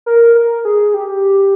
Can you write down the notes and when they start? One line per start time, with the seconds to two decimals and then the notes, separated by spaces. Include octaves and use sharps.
0.06 A#4
0.35 A#4
0.65 G#4
0.94 G4